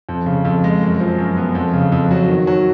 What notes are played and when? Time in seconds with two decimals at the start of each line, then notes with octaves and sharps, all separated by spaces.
0.09 F2
0.26 C#3
0.45 F2
0.64 G#3
0.82 F#2
1.00 F3
1.19 F#2
1.37 B3
1.55 F2
1.73 C#3
1.92 F2
2.11 F#3
2.29 D#3
2.47 F#3